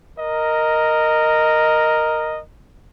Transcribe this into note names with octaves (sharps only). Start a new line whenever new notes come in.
A#4 D#5